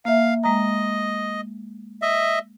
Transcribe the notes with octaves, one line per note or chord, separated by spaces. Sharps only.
A#3 E5 F5
G#3 D#5 A#5
D#5 E5